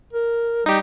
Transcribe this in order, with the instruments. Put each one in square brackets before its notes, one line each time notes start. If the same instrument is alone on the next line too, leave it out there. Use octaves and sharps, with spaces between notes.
[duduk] A#4
[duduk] G3 [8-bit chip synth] D#4 G4